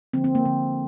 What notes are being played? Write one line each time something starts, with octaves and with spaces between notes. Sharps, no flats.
D3 F3 A#3 C4
C4
A#3
D3 F3 A#3